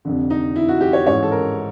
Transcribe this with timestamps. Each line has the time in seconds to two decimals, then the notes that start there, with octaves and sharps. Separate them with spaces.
0.05 F1 F2 D3
0.30 D#4
0.56 E4
0.68 F#4
0.81 G4
0.93 C#5
1.06 A1 G#2 E3 C#5
1.23 A4
1.32 A#4